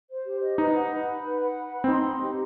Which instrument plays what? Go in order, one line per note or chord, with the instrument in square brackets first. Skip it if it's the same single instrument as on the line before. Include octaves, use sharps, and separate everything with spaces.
[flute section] C5
G4
D#5
[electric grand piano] D#4 [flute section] B4
[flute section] F#5
B4
B5
B4
F#5
B4
B5
[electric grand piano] C4
[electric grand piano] D#4 [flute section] C6
[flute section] D#5
G4